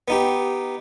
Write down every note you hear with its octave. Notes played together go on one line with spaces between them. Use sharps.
B3 D#4 G4